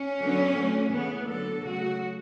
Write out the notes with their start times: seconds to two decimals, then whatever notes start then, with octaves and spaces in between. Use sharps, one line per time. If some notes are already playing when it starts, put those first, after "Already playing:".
Already playing: C#4
0.18 D3 F#3 B3
0.54 D3 F#3 A3
0.90 C#3 E3 A3 B3
1.26 D3 F#3 B3 A4
1.62 C#3 F#3 A3 F#4